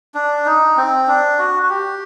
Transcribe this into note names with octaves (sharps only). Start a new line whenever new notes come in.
D4
D#4
C4
D4
F#4
F#4
G4